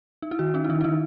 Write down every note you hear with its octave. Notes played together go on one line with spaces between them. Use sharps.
D#4
E4
D#3 F#4
C#4 D#4
E4
D#3 D#4
E4
D#3 D#4